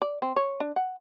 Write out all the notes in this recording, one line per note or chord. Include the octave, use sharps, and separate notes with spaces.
D5
C4
C#5
D4
F#5